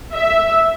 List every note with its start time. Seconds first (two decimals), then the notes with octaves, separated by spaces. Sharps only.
0.14 E5